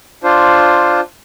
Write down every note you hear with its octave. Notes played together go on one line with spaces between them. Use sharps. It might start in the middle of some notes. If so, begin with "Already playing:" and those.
D4 F4 C5